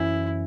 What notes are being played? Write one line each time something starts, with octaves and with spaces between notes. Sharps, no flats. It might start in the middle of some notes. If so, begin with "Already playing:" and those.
Already playing: F#2 E3 C#4 E4